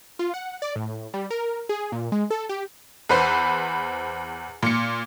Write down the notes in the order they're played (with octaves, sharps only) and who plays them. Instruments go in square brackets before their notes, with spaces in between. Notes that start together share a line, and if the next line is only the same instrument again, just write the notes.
[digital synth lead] F4
F#5
D5
A2
G3
A#4
G#4
A#2
G#3
A4
G4
[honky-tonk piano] E2 B4 C5
A#2 C#7